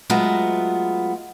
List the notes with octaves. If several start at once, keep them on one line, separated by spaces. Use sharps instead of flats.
F#3 G#3 A3 B3 F4 F#4